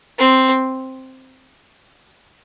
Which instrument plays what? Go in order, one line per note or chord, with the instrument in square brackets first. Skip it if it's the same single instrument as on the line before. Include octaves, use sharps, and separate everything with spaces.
[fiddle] C4